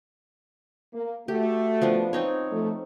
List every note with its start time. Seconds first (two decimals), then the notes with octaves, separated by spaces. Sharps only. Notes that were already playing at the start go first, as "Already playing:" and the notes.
0.94 A#3
1.28 A3 F#4 G4
1.82 F3 B3 D4
2.13 C4 D#4 C#5
2.52 F3 A3